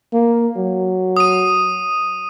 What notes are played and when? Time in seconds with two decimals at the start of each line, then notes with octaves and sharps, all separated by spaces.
0.13 A#3
0.57 F#3
1.17 D#6 D#7